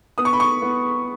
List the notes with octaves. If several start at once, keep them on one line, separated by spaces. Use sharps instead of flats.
B3 D#6
C#6
B5
C#6
B3